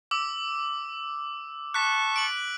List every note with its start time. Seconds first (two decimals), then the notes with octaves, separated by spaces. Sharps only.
0.11 D6 E6
1.74 A5 C#6 F#6 B6
2.16 D7 F#7